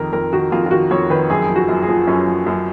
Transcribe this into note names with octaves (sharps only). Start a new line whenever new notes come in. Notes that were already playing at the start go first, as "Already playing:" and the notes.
Already playing: F2 D#3 A#4
F2 A#4
D#3 F#4
F2 F4
F4
D#3 F#4
F2 C#5
D#3 B4
F#2 G#4
F3
F#4
F#2
G#4
F3
F#2 C#4
F3
F#2